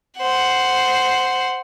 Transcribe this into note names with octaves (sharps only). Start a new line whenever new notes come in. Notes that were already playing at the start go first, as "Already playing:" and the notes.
C5 F#5